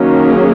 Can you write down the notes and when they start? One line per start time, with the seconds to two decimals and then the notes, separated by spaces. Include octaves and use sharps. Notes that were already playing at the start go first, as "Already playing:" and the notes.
Already playing: D#3 F#3 A#3 C#4
0.13 G#4